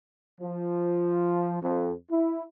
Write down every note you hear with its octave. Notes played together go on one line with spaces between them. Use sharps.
F3
F2
E4